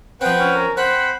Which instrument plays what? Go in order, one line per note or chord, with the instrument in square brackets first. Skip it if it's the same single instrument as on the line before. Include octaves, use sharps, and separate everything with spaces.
[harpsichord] F3 C4 [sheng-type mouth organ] B4 F#5 G5
[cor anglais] C#4
[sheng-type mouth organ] A#4
[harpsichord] C4 [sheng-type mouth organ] C5 B5 [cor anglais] F#5